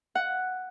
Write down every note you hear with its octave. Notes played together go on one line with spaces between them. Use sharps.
F#5